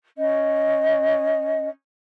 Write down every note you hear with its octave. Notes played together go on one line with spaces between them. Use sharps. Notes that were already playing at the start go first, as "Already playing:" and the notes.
C#4 D#5